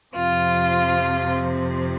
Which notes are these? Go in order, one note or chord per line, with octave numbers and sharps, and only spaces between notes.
F2 C3 F3 C4 F4